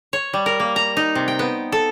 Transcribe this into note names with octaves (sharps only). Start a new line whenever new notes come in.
C#5
G3
A#4
A#3
A#5
D#4
C3
G5
B3
A4